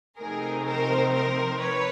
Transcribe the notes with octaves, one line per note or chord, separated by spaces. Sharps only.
C3 F3 A3 C4 D#4 G#4 A#4
A#4 C5
A#4 C5
B4 C#5